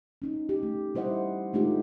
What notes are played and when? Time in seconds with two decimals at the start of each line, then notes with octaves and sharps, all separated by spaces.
0.22 C#4 D#4
0.49 G4
0.63 A3
0.95 G3 E4 C5 D#5 F#5
1.53 G#3 A3 D4 D#4 F4 G4